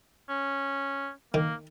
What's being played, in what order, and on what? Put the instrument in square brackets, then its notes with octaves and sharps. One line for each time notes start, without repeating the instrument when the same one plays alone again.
[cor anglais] C#4
[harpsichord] D#3 [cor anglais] A#3